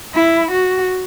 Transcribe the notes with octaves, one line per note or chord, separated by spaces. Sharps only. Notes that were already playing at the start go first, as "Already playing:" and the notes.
E4
F#4